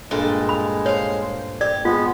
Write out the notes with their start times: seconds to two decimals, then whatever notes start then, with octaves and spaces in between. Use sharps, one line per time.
0.11 G2 A#2 G#3 A4
0.49 B5
0.86 C5 C#5 F5
1.61 G4 D5
1.85 G#3 B3 F4